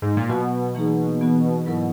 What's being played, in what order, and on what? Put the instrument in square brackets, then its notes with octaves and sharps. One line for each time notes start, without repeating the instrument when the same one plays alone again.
[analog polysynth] G#2
A#2
[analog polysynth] B2 [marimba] F#3 B3 F#4
[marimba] E3 A#3 D#4 G#4
E3 B3 F#4
G#2 F#3 B3 E4 A#4